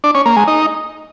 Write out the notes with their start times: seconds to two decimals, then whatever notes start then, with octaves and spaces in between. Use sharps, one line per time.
0.04 D4
0.15 C#4
0.26 A#3
0.37 G#3
0.47 D#4